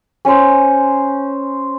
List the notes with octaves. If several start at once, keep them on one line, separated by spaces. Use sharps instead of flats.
C#4 C5